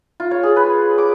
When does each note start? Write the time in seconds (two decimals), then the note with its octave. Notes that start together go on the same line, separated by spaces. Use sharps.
0.20 F4
0.31 C#5
0.43 G#4
0.56 B4
0.98 D6